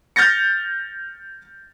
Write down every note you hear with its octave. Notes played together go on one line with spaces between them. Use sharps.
F6 G6 A6 A#6 C#7